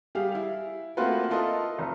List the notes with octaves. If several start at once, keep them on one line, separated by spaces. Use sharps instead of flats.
G3 G4 G#4 F5
E4
A3 A#3 C4 F4 F#4 B4
E4 F4 A4 A#4 D#5
F1